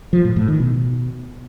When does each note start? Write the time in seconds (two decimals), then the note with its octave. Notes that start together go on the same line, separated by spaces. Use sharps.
0.13 F3
0.25 A2
0.36 A2
0.48 D#3
0.60 B2